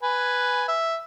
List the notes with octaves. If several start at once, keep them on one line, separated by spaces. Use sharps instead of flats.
B4 G#5
E5